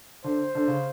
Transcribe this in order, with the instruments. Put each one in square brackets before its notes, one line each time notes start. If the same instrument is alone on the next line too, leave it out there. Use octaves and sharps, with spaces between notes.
[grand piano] D3 [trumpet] C5
[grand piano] D3
C#3